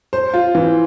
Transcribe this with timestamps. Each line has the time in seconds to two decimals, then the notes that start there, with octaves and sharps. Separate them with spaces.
0.13 C5
0.34 F4
0.55 E3